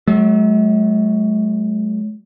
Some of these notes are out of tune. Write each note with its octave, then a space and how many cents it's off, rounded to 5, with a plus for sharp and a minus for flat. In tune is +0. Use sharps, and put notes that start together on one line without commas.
F#3 +15 A3 -45